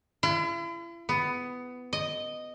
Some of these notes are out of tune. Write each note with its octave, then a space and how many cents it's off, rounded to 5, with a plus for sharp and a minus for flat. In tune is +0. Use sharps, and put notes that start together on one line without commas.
E4 +45
B3 +15
D#5 -5